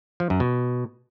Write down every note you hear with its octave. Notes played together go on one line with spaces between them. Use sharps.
F3
F#2
B2